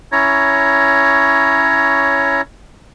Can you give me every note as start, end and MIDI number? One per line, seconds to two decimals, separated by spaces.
0.12 2.41 61
0.12 2.41 64
0.12 2.41 73
0.12 2.41 82